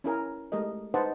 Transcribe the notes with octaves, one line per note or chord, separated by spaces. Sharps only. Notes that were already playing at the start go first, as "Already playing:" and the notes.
C#4 E4 A#4 G#5
G#3 A3 G4 A#4 D#5
D#4 B4 C5 D#5 F#5 A5